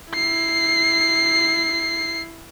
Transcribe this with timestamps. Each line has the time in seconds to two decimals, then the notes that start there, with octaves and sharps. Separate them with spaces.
0.13 E4 C7